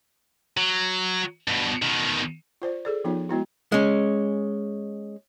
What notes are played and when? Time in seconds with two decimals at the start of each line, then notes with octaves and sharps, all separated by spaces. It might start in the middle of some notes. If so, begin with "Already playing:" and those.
0.57 F#3
1.47 G2 B2
1.82 B2 D#3
2.62 F4 C5 D5
2.85 G#4 A4 D5
3.05 F3 B3 D#4 F4
3.29 G#3 B3 E4 F#4
3.72 G#3 C#4